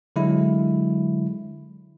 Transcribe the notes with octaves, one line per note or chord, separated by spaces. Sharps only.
D3 F#3 G#3 E4